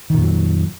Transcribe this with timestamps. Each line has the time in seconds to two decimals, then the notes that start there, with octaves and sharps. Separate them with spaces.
0.10 D#3
0.14 A#2
0.18 F2
0.22 F#3